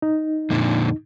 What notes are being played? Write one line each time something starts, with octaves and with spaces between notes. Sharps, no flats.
D#4
F2 A#2 D3